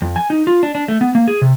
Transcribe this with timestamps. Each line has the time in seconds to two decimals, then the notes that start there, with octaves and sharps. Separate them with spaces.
0.02 F2
0.16 G#5
0.30 D#4
0.47 F4
0.63 D4
0.75 D4
0.88 A3
1.01 B3
1.15 A#3
1.28 G#4
1.42 C3